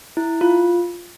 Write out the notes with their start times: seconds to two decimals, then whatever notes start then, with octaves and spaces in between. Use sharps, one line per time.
0.17 E4
0.41 F4